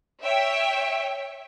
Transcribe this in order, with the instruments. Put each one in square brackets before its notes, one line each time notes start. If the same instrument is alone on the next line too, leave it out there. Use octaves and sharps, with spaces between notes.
[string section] C#5 E5 G5